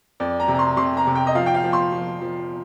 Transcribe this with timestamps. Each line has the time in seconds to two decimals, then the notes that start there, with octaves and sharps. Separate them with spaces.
0.20 F2 D5
0.40 A#5
0.48 C3
0.54 A#5
0.59 C6
0.77 C3 C6
0.97 A#5
1.07 C3
1.15 G5
1.27 D#5
1.35 F3 F5
1.46 G5
1.54 F5
1.64 F3
1.73 C6
1.92 F3
2.21 F3